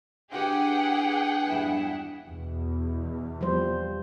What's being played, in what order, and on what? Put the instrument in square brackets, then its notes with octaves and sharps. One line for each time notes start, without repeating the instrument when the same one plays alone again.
[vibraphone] D4 B4 [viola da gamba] E4 G4 [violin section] G#4 F#5 G5
[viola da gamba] E2 G2 E4
[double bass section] E2 B2
[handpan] F3 G3 C5